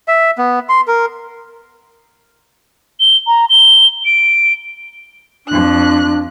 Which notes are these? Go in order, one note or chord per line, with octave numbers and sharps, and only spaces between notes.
E5
B3
C6
A#4
G7
A#5
G7
D7
F2 D4 F#6